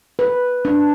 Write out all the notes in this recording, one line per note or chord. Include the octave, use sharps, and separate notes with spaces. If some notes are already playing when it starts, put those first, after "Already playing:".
B4
D4